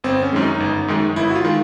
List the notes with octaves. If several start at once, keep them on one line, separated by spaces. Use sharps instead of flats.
G1 C4
C#4
F#2 D#3 G#3
D#4
G1
F#2 D#3 G#3
G1 E4
F#4
F4
D#3 G#3